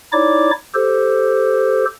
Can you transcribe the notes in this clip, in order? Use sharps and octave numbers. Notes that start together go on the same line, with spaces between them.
D#4 E4 C#5 D5 D6
G4 A4 C5